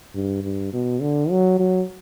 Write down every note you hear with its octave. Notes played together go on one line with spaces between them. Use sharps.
G2
G2
B2
D3
F#3
F#3